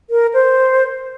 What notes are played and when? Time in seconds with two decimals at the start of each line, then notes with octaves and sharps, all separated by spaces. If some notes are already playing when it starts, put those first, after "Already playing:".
0.10 A#4
0.34 C5